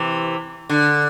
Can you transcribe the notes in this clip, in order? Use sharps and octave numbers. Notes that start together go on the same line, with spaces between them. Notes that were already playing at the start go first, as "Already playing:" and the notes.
Already playing: C3 E3
D3